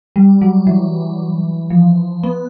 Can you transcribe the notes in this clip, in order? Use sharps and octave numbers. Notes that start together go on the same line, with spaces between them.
G3
F#3
E3
F3
B3